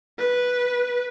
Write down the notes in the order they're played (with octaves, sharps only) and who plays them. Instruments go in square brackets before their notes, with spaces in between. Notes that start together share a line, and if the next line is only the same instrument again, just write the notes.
[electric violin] B4